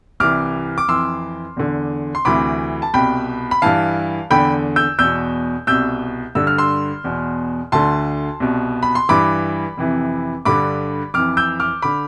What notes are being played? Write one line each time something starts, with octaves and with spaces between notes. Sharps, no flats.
C2 C3 E3 D6 F6
D6
F2 E3 C6 E6
E2 D3
C6
D2 C3 E3 B5 D6
A5
C2 B2 G5 B5
B5
G2 E3 F5 A5
E2 D3 G5 B5
E6 G6
E2 B2 E6 G6
C2 B2 E6 G6
G2 D3 E6
F6
C6 E6
E2 B2
D2 D3 A5 C6
C2 B2
B5
C6
G2 E3 B5 D6
F2 C3 E3
G2 D3 B5 D6
F2 E3 D6 F6
E6 G6
D6 F6
D3 B5 D6